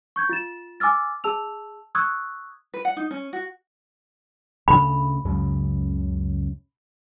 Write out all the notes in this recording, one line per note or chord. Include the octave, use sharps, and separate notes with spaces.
C#6 G6 G#6
F4 A6 E7
G#5 D6 E6 F6 A6
G#4 A5 E6 F7
C#6 D#6 E6 F#6 G#6
B4
F#5
D#4
C#4
F#4
D2 C#3 A3 B5
C#2 F#2 C#3